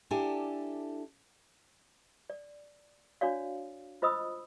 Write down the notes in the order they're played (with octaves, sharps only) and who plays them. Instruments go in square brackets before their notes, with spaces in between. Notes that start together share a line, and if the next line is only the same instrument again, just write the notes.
[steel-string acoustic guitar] D4 E4 G4 A4 G#5
[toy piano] D5
D4 F#4 C#5 D5 F5
F4 C5 D#5 B5 D#6 E6